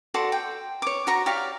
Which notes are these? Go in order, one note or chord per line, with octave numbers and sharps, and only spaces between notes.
F#4 A4 D5 C6
G5
C#5 D6
F#4 A#5 C#6
G4 C#5 D5 F5